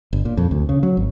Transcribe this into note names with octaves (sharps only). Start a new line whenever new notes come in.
G1
A#2
F2
D2
C#3
F#3
G#1